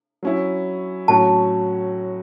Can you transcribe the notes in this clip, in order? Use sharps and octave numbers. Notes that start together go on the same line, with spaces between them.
F#3 C#4 E4
A2 F#3 C#4 F#4 A5